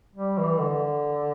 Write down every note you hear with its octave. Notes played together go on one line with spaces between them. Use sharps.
G3
E3
D3